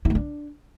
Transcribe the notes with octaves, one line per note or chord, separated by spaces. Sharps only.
E4
A3
D4